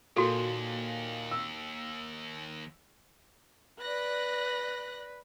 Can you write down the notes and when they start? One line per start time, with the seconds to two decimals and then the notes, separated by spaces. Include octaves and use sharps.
0.16 D#2 A#2 F#4 A4
1.31 E6
3.81 B4 D5 F#6 A#6